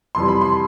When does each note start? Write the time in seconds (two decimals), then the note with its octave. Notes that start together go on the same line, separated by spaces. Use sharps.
0.15 F2 C3 E3 G3 C6
0.28 B5
0.41 C6